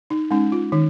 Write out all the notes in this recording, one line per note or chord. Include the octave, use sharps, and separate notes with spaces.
D#4
G#3 C#4 D#4
F4
D#3 D#4